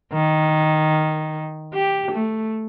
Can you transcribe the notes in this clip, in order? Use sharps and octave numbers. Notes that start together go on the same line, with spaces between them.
D#3
G4
A3